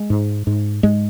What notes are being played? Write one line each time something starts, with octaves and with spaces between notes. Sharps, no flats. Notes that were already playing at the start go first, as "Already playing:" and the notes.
Already playing: G#3
G#2
G#2
G#2 G#3